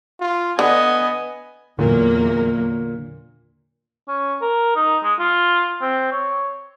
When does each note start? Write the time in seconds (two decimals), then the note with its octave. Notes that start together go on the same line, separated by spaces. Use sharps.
0.21 F4
0.59 D3 B3 D#5 G#5
1.79 E2 A#2 D3 F#3 A#3
4.08 C#4
4.42 A#4
4.76 D#4
5.03 G#3
5.19 F4
5.82 C4
6.12 C#5